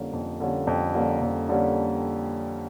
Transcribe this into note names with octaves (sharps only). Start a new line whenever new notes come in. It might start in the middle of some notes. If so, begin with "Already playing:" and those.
Already playing: F2 D3 G3 A#3 C#4
F2
D3 G3 A#3 C#4
F2
D3 G3 A#3 C#4
F2
D3 G3 A#3 C#4